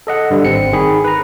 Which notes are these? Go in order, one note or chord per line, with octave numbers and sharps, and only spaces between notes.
A4 D#5 F#5
G2 D3 G3
G#1 C4 C#7
D#3 G#4 B5
B4 A#5